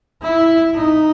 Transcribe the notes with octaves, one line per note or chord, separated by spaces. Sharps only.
E4
D#4